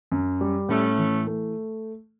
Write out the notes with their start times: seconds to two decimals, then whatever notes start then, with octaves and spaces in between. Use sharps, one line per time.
0.12 F#2
0.41 G3
0.69 A2 A3 C#4
0.98 E3
1.27 A3